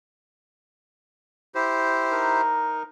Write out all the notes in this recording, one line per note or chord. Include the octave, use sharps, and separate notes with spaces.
E4 G4 C5
D#4 A#4